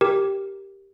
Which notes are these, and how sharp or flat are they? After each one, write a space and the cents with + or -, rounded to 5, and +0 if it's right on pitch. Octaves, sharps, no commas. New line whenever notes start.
G4 +0 A#4 +0